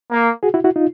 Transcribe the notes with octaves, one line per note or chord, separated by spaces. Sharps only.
A#3
F#4 G#4
E4 F#4
E4 F#4
D#4 F4